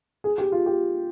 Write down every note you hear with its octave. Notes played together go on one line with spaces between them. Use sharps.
G#4
G4
F4
G4